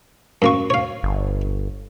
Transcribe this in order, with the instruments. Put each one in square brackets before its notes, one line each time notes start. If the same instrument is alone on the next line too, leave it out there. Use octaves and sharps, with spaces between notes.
[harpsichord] F#2 A#3 C#6
C#5 F5
[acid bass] G1